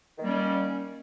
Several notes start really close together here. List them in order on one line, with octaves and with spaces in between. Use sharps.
D#3 A#3 G3 C#4